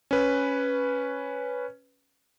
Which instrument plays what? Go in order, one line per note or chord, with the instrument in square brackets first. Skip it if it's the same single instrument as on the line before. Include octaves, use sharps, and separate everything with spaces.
[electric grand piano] C#4 B4